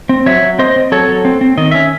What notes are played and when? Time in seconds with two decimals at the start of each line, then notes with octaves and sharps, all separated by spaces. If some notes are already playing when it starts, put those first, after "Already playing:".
0.09 C4
0.26 F#3 C#5 E5
0.43 F#3
0.59 C4 C5 D#5
0.76 C4
0.92 F#3 A4 C#5
1.08 F#3
1.25 C4
1.41 C4
1.58 D#3 D#5
1.71 C#4 E5